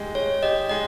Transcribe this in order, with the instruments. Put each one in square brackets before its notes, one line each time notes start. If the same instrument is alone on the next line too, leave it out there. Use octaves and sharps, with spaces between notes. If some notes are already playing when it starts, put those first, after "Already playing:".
Already playing: [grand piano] G#3 G4
[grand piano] G#3 [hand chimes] C#5
[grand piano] G4 [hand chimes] D#5
[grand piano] G#3 [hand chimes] D#5